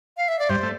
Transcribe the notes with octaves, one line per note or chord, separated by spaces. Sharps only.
F5
E5
D5
G2 G3 C5
A3